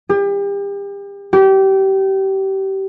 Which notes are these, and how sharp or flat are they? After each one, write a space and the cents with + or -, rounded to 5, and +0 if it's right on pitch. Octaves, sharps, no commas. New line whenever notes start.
G4 +35
G4 -25